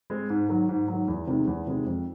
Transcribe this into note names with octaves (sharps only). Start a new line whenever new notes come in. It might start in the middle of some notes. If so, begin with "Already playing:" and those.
G#3 C4
G#2
D#3 F#3
G#2
D#3 F#3
E2
C3 D#3 G#3
E2
C3 D#3 G#3
F2